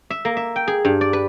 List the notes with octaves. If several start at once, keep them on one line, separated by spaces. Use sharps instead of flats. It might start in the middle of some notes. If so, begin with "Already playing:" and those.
E5
A#3
E5
G5
G#4
G2
D5
B4